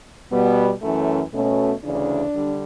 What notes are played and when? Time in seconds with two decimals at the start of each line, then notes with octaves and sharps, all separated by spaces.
0.31 B2 G3 B3
0.81 F#2 E3 A3 C#4
1.32 B2 A3 C#4
1.83 D2 C#3 E3 D4
2.34 D3 G3